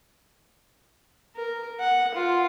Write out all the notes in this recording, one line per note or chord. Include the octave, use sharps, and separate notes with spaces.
A#4
F#5
F4